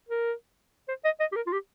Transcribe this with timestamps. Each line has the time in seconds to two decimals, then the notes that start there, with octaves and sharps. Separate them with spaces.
0.08 A#4
0.88 C5
1.04 D#5
1.20 D#5
1.32 G4
1.36 A#4
1.47 F4
1.52 G4